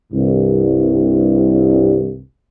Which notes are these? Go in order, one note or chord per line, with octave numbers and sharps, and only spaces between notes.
C2 G2